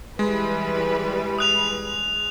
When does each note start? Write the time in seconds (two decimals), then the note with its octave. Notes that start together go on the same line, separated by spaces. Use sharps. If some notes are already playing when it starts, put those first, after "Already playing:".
0.19 E3 G3 G#3 B4
1.38 D#6 F#6 F7